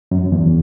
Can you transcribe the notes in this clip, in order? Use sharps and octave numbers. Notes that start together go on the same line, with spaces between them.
F#2
E2